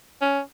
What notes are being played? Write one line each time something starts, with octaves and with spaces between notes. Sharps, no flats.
C#4